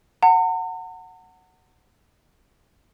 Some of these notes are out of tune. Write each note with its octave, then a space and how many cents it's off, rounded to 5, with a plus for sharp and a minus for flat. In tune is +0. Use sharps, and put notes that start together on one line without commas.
F#5 +0 A#5 -45